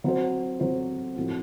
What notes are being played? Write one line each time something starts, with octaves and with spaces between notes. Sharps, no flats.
F#3 C4 F#4 C5
F#3 C4 F#4 C5
A2 F3 C4 F#4